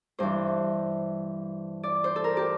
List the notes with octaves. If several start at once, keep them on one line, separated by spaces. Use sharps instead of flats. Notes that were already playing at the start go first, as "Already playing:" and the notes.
G2 E3 C5
D5
C5
A4
A#4
G4